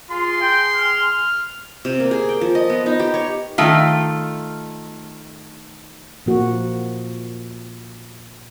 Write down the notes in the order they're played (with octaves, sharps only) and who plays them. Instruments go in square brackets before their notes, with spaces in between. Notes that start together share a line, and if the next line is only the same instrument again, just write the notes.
[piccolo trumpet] F4 [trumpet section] G#4 C6
[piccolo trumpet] G5
F6
[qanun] C3
A#3
G#4
G5
F3
D#5
B3
D#4
G4
C#5
[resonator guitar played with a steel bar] D#3 A3 F4
[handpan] A#2 F3 A#3 F#4